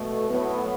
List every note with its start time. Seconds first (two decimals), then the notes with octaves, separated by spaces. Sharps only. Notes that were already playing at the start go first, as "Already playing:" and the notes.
Already playing: B2 A3
0.27 A2 F#3 B3